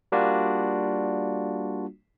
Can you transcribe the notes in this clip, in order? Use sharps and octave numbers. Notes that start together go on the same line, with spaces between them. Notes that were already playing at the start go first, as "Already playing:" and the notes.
G3 A#3 D4 F4 F#4